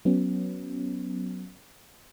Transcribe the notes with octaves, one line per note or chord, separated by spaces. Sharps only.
F#3 B3 C#4